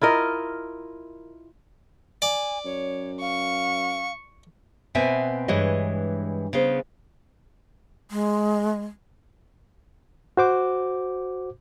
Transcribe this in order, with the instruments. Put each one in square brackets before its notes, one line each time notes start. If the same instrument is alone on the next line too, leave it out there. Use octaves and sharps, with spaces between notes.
[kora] E4 F4 A#4 D#5
[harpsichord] D5 [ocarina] G#5
[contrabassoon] F#2 [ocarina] C#5
[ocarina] F5 [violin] C#6
[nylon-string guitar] B2 B3 C4 E5 G#5
G2 E3 G#3 C#5 D#5
C#3 B3 C5
[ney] G#3
[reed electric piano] F#4 C5 D6